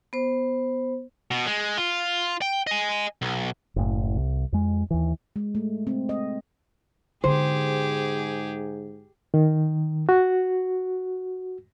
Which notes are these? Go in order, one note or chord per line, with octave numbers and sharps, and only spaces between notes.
B3 C5
B2
G#3
F4
G5
D#5 G#5
B1
F#1 A2
C2
F2 G#3
D#2 E3
G#3
A3
C4
D#5
G#2 D3 B3 G4 G#4 C5
D#3
F#4